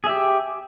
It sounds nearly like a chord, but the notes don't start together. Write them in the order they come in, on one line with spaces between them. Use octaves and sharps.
G#4 E5 G4